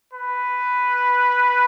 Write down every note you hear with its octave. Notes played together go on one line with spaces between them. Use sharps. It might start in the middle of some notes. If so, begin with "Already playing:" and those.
B4